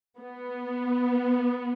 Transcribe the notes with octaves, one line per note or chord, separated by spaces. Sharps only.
B3